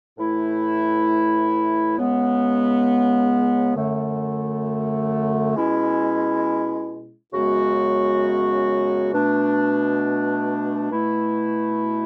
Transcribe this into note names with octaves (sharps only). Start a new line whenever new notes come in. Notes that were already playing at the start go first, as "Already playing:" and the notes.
A2 E3 A3 E4
C#2 C#3 G#3 B3
F#2 D3 A3
B2 G#3 C#4 E4
F#2 C#3 G#3 B3 F#4
B2 A3 D4
B2 A3 E4